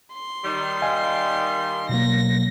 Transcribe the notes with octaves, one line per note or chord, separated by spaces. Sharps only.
C6
D#3 G3
D#5 F5 G#5
B2 F#3 A#3 A#6